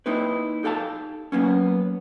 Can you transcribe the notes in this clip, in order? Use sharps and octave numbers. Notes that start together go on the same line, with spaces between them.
A#3 C4 D#4 E4 B4
D#4 G4 A4 F5 A5
F#3 A#3 B3 C#4